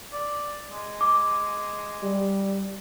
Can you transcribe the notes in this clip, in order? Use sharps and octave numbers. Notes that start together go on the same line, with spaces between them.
D5
G#3
D6
G3